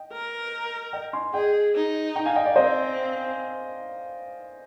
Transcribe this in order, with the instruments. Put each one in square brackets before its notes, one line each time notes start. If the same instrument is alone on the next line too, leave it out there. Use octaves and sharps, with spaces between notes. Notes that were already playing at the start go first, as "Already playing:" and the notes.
Already playing: [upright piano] D#5 G5
[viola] A#4
[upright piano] D#5 G5
G#5 C6
[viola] G#4 [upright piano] D#5 G5
[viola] D#4
[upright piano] G5 A#5
F5 G#5
D#5 G5
D5 F5
[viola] C4 [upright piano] C5 D#5